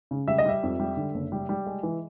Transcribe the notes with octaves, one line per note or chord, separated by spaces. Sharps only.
C#3
G3 E5
D#5
G3 E5
F2
G3
D3
F#1
G3
G3
G#3
E3